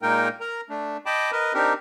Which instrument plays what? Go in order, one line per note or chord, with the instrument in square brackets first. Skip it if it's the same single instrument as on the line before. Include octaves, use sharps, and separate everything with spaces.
[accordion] A#2 G#3 A#3 D#4 A#4 G5
A#4 A#5
A3 D4
D#5 G5 A5 B5 D6
A#4 B4 D#5
C4 D4 D#4 G4 A#4